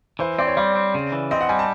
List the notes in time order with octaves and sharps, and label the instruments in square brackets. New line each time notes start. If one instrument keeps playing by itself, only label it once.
[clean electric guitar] E3 [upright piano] C5
[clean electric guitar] C4 [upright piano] D5
[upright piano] C#5
[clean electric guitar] G3 [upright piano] D5
[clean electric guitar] C4
C#3
E3
[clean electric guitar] C4 [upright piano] D#5
[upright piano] F#5
[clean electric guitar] G3 [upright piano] G#5
[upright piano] A5